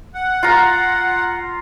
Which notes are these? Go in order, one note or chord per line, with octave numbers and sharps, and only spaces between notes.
F#5
F4 A#5